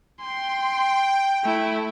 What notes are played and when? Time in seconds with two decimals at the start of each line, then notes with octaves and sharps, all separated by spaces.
0.21 G5 C6
1.44 A3 E4